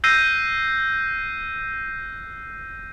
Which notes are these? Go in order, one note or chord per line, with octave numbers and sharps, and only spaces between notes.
E6 F#6 G6 A#6 C7 D#7